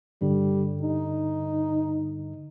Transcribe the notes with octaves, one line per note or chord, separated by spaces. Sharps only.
G2 D3 G3
D#4